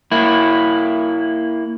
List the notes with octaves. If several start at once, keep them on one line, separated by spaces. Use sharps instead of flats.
A#3 E4